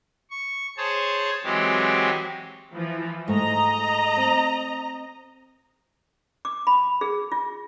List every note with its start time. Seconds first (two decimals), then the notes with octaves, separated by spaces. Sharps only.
0.30 C#6
0.77 G#4 C5 C#5 A5
1.44 E3 F#3 G#3 C4 G4
2.73 E3 F3
3.28 G#2 A3 D#5 A#5
4.17 C4
6.45 D6
6.67 B5
7.01 G#4
7.32 F4